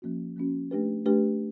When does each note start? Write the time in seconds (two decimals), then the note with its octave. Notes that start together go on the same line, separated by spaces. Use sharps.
0.02 F3 A#3 C#4 F#4
0.37 F3 A#3 C#4 F#4
0.71 A3 D4 G4 B4
1.06 A3 D4 G4 B4